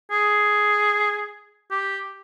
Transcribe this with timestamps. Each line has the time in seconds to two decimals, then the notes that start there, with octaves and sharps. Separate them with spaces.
0.11 G#4
1.71 G4